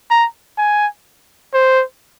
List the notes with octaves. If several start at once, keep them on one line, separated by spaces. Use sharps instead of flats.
A#5
G#5
C5